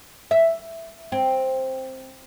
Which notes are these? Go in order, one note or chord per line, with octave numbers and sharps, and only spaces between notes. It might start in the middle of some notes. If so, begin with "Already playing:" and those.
E5
C4